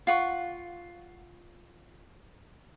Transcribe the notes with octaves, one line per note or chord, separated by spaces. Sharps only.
F4 F#5 C#6